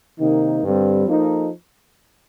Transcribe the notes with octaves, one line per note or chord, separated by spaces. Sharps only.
C3 D#3 A#3 D#4
G2 D3 G3 C4
F3 A#3 D#4 A4